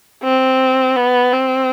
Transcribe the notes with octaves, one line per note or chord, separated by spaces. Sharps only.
C4
B3
C4